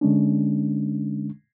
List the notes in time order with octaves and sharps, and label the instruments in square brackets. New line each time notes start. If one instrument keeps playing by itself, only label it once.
[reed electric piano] D3 G#3 C#4 D4